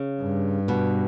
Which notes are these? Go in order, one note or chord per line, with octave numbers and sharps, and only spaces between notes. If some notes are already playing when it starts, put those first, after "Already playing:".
Already playing: C#3
G2
B2